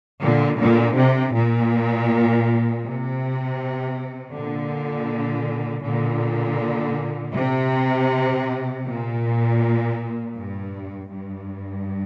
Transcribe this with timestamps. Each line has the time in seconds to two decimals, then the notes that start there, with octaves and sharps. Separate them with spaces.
0.22 A#2 D3
0.58 A#2 D3
0.96 C3
1.35 A#2
2.85 C3
4.34 A#2 D3
5.85 A#2 D3
7.35 C3
8.86 A#2
10.36 G2
11.11 G2